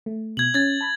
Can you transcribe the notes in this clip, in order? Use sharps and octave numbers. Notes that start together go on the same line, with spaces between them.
A3
B2 G#6 F#7
C#4 G#6 A6
A5 B5